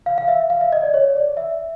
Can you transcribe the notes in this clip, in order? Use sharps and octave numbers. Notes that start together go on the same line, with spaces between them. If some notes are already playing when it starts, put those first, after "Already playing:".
F5
F5
E5
F5
E5
D#5
D5
C#5
D5
E5